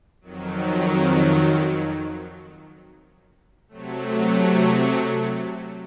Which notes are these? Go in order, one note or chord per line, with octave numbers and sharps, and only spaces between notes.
F2 D#3 F#3
C3 F#3 A3